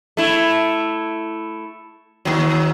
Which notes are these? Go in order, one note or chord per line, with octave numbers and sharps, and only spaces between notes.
A3 E4
D#2 F#3